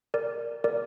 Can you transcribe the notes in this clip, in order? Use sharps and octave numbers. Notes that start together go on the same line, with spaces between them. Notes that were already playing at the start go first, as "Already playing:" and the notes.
A#4 D5
A#4 D5